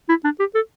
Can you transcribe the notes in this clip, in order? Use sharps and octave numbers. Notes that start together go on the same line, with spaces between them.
E4
D4
G4
A4